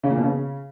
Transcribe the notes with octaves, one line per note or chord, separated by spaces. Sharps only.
C#3
A#2
B2
C#3